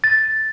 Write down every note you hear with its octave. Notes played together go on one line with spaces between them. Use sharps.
A6